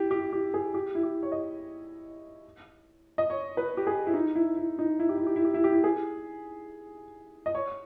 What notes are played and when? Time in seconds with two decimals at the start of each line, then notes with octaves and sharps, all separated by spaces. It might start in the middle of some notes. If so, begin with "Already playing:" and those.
Already playing: E4 G4
0.11 G4
0.33 G4
0.54 G#4
0.74 G4
0.95 E4
1.03 G4
1.23 C#5
1.32 D#5
3.18 D#5
3.30 C#5
3.57 B4
3.77 G4
3.87 G#4
4.07 E4
4.14 D#4
4.36 E4
4.57 E4
4.79 D#4
5.00 E4
5.09 G4
5.17 E4
5.26 G4
5.36 E4
5.44 G4
5.54 E4
5.64 G4
5.72 E4
5.84 G#4
7.46 D#5
7.55 C#5